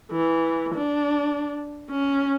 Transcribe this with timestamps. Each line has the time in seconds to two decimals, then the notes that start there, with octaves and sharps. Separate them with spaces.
0.12 E3
0.75 D4
1.91 C#4